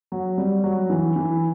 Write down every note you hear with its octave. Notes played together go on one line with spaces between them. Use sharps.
F#3
G3
F#3
E3
E3